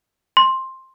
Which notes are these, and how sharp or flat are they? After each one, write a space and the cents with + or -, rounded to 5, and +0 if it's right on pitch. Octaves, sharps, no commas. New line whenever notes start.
C6 +10